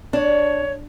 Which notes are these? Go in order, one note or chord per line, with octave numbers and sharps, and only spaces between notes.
D4 C#5